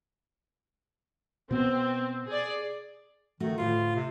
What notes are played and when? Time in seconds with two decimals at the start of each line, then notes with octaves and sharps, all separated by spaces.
1.51 B2 B3 C4
2.27 G#4 D5
3.40 D#3 A3 F#4
3.58 D2 A2 F4
3.96 C3